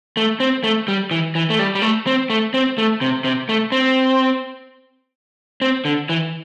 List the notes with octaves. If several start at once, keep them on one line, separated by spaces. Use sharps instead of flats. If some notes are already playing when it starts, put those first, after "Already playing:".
A3
C4
A3
G3
E3
E3
A3
G3
G3
A3
C4
A3
C4
A3
C3
C3
A3
C4
C4
D3
E3